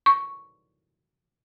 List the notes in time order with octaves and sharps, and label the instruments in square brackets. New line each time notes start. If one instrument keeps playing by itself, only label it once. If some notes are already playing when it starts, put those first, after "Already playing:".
[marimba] C#6